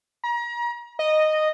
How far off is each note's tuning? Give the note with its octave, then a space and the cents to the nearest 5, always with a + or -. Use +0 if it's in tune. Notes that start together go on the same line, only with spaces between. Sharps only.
A#5 +35
D#5 -10